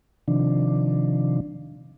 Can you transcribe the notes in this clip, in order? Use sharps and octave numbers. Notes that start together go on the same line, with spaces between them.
C3 D#3 F3 D4